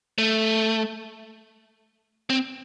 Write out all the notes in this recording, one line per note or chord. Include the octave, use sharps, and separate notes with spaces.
A3
C4